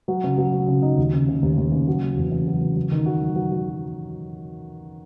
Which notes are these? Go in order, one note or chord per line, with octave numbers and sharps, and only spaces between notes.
F#3
C#3
F#3
F#3
C#3
D#4
D#2
C#3
C#3
D#2
D#2
C#3
F#3
F#3
E2
C#3
F#3
C#3
F#3
D#3
F#4
F#3
F#3
F#3